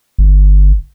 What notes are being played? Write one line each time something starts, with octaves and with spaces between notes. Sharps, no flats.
G1